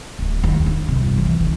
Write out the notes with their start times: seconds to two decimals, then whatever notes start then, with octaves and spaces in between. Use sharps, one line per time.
0.19 D1
0.44 D#2
0.66 D#4
0.88 C3
1.02 G1
1.18 E3
1.40 D3